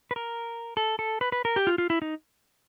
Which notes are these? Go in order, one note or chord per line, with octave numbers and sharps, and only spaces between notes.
B4
A#4
A4
A4
B4
B4
A#4
G4
F4
F4
E4
D#4